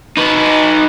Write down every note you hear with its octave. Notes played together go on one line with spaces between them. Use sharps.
D#4 B4